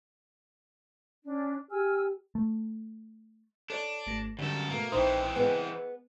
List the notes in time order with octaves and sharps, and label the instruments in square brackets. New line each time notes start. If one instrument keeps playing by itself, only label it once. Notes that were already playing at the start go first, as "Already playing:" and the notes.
[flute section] C#4 D4
[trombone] G4 [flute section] G#5 E6 F6
[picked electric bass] A3
[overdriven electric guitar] D4 [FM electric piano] A4 C#5 D5
[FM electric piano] G#1 A3 A#6
[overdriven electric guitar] F#2 A4 [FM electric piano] D3 D4 [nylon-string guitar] G3
[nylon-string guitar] B2 A3 [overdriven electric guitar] A#3
[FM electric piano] A#1 A#2 D#6 [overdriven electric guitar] E3 C4 [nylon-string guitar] D#4 E4 C5
[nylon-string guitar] B3 G#4 D#5 [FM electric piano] B4 G#5